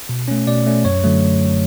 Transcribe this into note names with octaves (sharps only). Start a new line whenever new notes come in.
B2
A3 C#4
B2 D5
A3 C#4
F#2 C#5
D3 F#3 A3